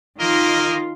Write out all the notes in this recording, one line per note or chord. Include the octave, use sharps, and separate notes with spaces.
D#3 A#3 F4 A#4 D#5